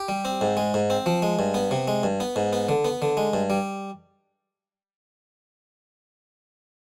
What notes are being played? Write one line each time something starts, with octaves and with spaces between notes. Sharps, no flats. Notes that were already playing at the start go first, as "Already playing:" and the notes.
Already playing: G4
G3
C4
G#2
G#3
G#2
C4
F3
G#3
G2
B3
C3
G#3
G2
B3
G#2
B3
D3
B3
D3
G#3
G2
G3